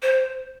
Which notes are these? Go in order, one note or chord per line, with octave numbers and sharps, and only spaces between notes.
C5